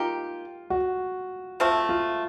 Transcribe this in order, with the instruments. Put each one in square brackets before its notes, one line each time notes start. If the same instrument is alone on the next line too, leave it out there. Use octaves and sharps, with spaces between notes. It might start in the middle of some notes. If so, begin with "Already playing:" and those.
Already playing: [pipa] A#3 D#4 G4 [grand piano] F4
[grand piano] F#4
[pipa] F3 A3 C4
[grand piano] F4